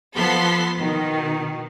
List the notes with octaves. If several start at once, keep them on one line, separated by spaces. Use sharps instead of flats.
F3 B3 A4 C6 B6
B2 D#3